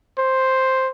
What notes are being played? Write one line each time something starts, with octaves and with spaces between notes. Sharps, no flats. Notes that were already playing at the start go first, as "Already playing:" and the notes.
C5